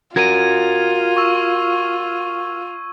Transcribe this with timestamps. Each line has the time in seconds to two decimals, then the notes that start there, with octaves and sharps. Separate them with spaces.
0.16 F4 F#4 A#4 G#6 D#7
1.17 C#6 E6